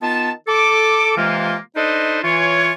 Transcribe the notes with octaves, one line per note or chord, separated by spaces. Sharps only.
D#3 B3 F4 A5
A4 D6
C3 E3 G#3 A#3 F4
D4 D#4 A4 B4 C5 D#5
E3 F4 C#5